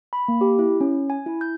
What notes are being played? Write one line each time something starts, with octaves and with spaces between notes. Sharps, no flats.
B5
A#3
G4
E4
C#4
G#5
E4
G6